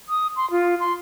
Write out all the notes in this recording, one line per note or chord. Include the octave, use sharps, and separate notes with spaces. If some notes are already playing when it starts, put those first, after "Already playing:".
D#6
C6
F4
C6